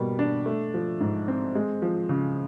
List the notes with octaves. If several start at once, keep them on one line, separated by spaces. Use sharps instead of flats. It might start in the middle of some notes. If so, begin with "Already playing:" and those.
Already playing: B2 G3 A#3
D4
A3
F3
G#2
C4
G#3
F3
C#3